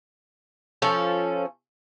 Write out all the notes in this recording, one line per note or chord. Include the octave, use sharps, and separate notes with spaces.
F3 C#4 A4